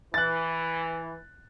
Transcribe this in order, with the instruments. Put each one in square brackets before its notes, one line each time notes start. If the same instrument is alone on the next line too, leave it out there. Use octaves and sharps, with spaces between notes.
[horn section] E3 [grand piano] F#6 A6